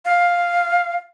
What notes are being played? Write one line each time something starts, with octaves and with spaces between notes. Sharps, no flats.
F5